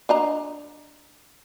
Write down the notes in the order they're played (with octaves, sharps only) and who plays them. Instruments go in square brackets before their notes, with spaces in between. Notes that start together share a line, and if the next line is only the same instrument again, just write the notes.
[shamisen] D4 D#5 A#5